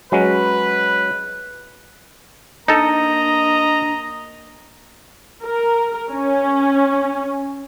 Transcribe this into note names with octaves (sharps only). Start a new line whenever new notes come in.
F#3 G#3 C#4 B4
A#3 D4 D#4 A4 D#5 A#5
A#4
C#4